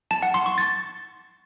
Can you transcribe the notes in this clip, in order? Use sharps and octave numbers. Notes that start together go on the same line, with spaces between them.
A5
F#5
C6
C#6
A6